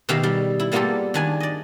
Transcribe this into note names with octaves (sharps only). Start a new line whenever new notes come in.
B2 D#3 G4 E5 F5
G3
E4
G3 A#3 B3 F4 G4 A4
D#3 D4 G#5
D5 D#5